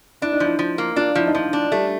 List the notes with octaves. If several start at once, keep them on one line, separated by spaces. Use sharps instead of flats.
D4 E4
D#4
F3 E4
F3
A#3
D4 F4
F3 E4
D#4
F3 D4
D4
G3 A3